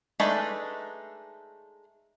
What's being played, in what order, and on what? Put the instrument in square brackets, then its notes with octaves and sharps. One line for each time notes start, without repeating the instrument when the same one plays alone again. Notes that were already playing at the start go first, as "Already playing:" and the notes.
[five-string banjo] G#3 A3 D4 D#4 B4